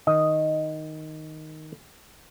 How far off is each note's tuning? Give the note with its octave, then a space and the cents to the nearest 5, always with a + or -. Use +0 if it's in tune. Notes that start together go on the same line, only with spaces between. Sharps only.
D#3 +0 D#5 +0